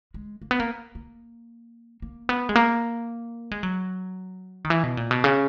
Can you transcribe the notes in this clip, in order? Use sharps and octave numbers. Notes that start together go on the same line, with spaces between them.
G#3
A#3
B3
A#3
A#3
A#3
B3
G#3
A#3
G#3
F#3
D#3
E3
B2
A#2
B2
C#3